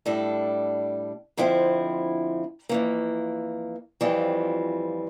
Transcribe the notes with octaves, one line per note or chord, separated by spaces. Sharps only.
A2 G3 D4 A4
F2 D3 F3 C4 E4
F2 E3 A#3
F2 E3 G3 C4 F4